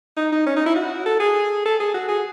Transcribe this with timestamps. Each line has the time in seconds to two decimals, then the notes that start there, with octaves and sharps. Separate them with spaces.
0.17 D#4
0.32 D#4
0.46 C#4
0.56 D#4
0.66 E4
0.76 F#4
1.06 A4
1.20 G#4
1.66 A4
1.80 G#4
1.94 F#4
2.08 G#4